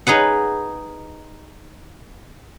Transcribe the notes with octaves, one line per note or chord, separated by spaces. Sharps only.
D#4 G#4 B4 F#5